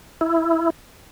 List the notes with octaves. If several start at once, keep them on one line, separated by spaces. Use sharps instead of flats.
E4